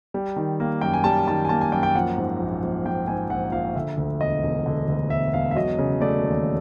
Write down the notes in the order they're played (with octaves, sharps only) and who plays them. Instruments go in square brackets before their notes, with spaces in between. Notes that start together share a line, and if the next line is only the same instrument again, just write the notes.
[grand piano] G3
D#3
A#3
F#2 G5
G#5
G3 A5
D#3 A5
G#5
A#3 A5
G#5
F#2 G5
G5
F3 F#5
G#2
A#1
A#1
F3 G5
G#2 G#5
A#1 F#5
A#1 F5
D3 E5
D2
E1 D#5
E1
D3
D2
E1 E5
E1 F5
E5
F#3 D#5
C#3
A3 D5
D#2